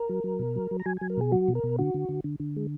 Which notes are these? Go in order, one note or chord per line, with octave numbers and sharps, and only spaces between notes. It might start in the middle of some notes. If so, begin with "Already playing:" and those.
Already playing: A#4
F#3
F#3
B2
F#3
F#3
A#5
F#3 G#5
F#3 G#5
A#4
B2 G#4
F#3 F#4
B2
A#4
B2
D3 F#4
D3
D3
D3
D3
G#3